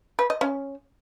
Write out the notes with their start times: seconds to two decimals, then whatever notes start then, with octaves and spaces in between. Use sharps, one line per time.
0.19 B4
0.30 D#5
0.41 C#4